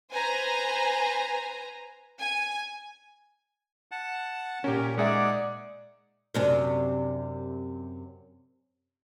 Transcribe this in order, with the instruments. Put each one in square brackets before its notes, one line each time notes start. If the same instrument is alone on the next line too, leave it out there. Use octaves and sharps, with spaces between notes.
[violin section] B4 C5 G#5 A#5
G#5
[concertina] F#5 A5
[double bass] A#2 [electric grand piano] C#4 G4 [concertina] A#4
[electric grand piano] G#3 G#4 E5 [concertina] D#4 F#5 [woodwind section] D5
[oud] F#2 C3 D4